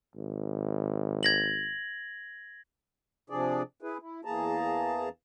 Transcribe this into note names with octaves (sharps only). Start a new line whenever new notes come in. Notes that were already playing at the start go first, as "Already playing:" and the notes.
G#1
G#6 A#6 F#7
C3 F3 D4 G#4 D5
E4 G#4 B4
E4
E2 E3 A#3 G#4 A5 A#5